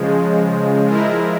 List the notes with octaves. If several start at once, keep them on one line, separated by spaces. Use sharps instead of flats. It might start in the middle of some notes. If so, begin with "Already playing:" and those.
Already playing: C#3 F3 G#3
F3 G#3 E4 A#4